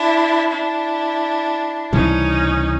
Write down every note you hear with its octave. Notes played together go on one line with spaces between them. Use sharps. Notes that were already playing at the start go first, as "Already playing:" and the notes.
Already playing: D4 E4
D4 E4
C#2 C3 E3 G3 C#4 D#4